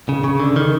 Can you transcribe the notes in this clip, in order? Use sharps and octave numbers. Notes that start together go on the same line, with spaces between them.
C#3
C#3
D3
D#3